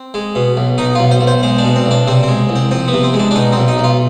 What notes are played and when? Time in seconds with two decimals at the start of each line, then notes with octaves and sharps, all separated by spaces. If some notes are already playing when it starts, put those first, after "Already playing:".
Already playing: C4
0.14 G#3
0.35 B2
0.57 B1
0.78 B2 D#4
0.95 B1 F4
1.11 C5
1.21 B1
1.27 C5
1.43 G#3 C5
1.58 D4
1.65 B2
1.76 C4
1.86 B1 D4
2.07 C3 C4
2.23 G#3 C4
2.49 C2
2.55 C4
2.71 F3 C4
2.88 B3
2.93 C3
3.03 C4
3.14 G#3
3.19 D4
3.31 D4
3.36 B2 D#4
3.52 B1 C4
3.68 D#4
3.79 B1 F4